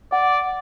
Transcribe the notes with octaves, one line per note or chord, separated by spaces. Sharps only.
D5 F#5